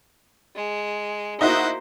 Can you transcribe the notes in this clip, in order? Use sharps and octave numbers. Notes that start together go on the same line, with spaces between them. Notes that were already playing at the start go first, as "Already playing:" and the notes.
G#3
A#3 D#4 E4 F#4 C5